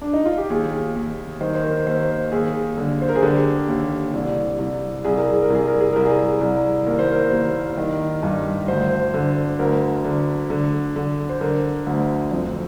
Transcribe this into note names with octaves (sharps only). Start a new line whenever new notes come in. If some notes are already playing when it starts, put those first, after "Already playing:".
D4
D#4
F4
G4
D#2 G#4
D#2
D#3 C5
C5
A#4
D#2 C5
D#2 G#4
D3
C5
A#4
G#4
D3 G4
D#2
C2
C2
C2 G#4
A#4
G#4
A#4
C2 G#4
A#4
G#4
C2 A#4
G#4
C2
D#2 A#4
C5
A#4
D#2
D#3
G2
D2 C5
D3
D2 A#4
D3
D3
D3
C5
D3 A#4
D2
F2